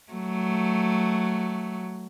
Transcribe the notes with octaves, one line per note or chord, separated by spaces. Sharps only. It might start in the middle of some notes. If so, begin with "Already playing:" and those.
F#3 A3